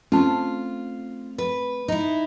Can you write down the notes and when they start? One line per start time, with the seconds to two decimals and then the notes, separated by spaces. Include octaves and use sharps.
0.12 A3 C4 C#4 F4 A5
1.38 B4
1.88 D#4 E4